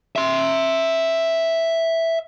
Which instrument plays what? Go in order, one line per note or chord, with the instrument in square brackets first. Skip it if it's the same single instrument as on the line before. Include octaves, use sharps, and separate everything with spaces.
[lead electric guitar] E5 C6